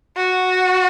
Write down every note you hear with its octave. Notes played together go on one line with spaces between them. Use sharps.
F#4